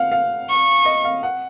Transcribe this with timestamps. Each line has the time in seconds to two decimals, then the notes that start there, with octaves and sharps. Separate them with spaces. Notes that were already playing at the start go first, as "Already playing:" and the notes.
Already playing: F5 F#5
0.12 F5
0.49 C#6
0.85 D#5
1.05 F5
1.23 F#5